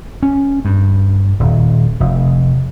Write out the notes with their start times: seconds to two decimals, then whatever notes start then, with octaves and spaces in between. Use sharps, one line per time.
0.23 C#4
0.65 G2
1.40 D#1
2.00 F1